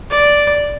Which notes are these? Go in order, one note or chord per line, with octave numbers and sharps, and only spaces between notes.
D5